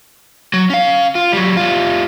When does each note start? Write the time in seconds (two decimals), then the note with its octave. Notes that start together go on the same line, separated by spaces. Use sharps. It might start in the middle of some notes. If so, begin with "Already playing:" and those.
0.54 F#3
0.70 C#4 F5
1.15 F4
1.32 F#3 G3
1.57 G3 F4